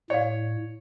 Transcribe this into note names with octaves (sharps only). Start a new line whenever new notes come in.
A2 C#5 D5 F5